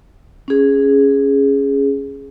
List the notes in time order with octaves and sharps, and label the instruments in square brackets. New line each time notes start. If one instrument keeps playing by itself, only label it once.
[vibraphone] C#4 G#4